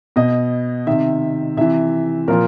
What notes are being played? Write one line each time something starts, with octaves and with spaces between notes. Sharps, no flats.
B2 D#5
C3 D#3 E5
C3 E3 E5
A#2 F3 A#4